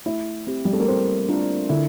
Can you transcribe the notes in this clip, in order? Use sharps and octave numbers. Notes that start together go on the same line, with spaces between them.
A3 E4
C4 G4
G3
A3
A#3
A3 C4
D4 F4 A#4
D3 E4